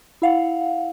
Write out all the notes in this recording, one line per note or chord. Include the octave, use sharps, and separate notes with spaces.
E4 F5 F#5